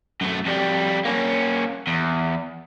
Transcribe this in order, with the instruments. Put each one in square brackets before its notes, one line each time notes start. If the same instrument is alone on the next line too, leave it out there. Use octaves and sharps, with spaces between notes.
[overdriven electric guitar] F#2 A3
F2 G3
A#3 C#4
E2